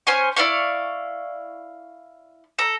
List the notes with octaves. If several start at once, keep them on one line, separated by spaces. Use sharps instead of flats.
C#4 C5 G#5 C#6
E4 D5 F5 C#6
A4 A#5